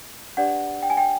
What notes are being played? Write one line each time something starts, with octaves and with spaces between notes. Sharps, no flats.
D4 G4 B4 D5 F#5
G5
G#5
G5